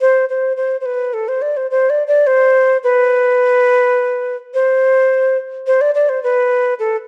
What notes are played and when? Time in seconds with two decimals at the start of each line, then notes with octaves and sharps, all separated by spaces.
0.01 C5
0.29 C5
0.57 C5
0.81 C5
0.86 B4
1.14 A4
1.28 C5
1.42 D5
1.57 C5
1.71 C5
1.90 D5
2.08 D5
2.27 C5
2.84 B4
4.54 C5
5.67 C5
5.81 D5
5.95 D5
6.09 C5
6.23 B4
6.79 A4